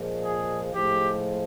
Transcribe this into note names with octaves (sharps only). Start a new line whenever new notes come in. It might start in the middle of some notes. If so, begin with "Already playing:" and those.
Already playing: A#2 F3 G#3
G#4
A2 F3 G#3 G4